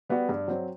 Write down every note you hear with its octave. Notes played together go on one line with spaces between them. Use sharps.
G3 B3 F#4
G2
F#3 C4